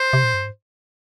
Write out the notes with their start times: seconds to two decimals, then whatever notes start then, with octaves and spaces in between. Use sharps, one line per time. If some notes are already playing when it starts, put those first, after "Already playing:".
Already playing: C5
0.13 C3
0.24 A#2
0.34 G2
0.44 G#2